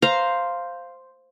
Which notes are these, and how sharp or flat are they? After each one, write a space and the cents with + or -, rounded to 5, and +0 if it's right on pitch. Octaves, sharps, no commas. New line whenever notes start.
C5 +0 F5 +0 A#5 +0